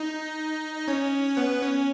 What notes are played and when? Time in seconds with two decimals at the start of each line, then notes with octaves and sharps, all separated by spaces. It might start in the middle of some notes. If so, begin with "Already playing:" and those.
Already playing: D#4 D#5
0.76 D#5
0.88 C#4 C#5
1.37 B3 B4
1.62 C#4 C#5